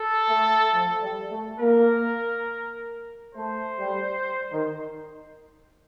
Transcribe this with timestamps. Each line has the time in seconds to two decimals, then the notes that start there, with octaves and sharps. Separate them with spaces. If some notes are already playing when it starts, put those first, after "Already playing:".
Already playing: A4
0.29 A3
0.73 F3
1.02 G3
1.31 A3
1.60 A#3 A#4
3.35 A3 C5
3.80 G3
4.52 D#3